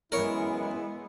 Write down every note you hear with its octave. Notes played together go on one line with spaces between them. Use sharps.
F#2 E3 G#3 B3 E4 A#4 C#5